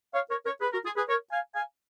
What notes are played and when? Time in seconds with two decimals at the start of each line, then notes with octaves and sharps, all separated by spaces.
0.14 C#5 F5
0.30 A#4 C#5
0.45 A#4 C#5
0.61 G#4 B4
0.73 F#4 A#4
0.85 F4 G#4
0.96 G#4 B4
1.08 A#4 C#5
1.31 F5 G#5
1.55 F5 G#5